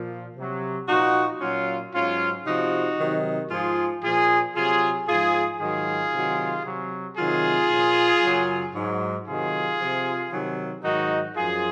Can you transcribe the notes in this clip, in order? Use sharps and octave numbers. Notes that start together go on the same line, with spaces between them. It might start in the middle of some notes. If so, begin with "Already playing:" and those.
Already playing: A#2 F3
C3 F#3
A#2 F3 D#4 F#4
A#2 F#3 C#4 F4
G#2 F#3 C#4 F4
C3 F3 D#4 F#4
C3 D#3 F#3
G#2 F3 F4 G#4
A#2 F3 F4 G#4
C3 F#3 F4 G#4
G#2 F3 F4 G#4
G#2 D#3 F#3 F4 G#4
C3 D#3 F#3
C3 F#3
C3 D#3 F#3 F4 G#4
A#2 F3
F#2 C#3 F#3
G#2 F#3
C3 D#3 F#3 F4 G#4
C3 F3
C3 D#3 F#3
G#2 D#3 F#3 D#4 F#4
F#2 F3 F4 G#4